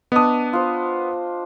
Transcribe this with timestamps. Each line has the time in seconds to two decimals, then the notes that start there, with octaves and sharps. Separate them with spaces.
0.12 B3 D4 D#5 D#6
0.53 F4 C5